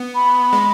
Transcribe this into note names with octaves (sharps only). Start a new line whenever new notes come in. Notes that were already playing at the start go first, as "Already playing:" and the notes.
Already playing: B3
B5
G#3